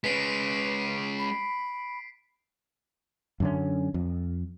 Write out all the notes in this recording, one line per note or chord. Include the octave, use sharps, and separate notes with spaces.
G#3 C#4 B4 B6 C7 D7
B5
F#2 D3 C#4
F2